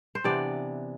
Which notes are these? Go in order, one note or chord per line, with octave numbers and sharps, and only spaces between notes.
C5
C3 E3 B3 D4 D5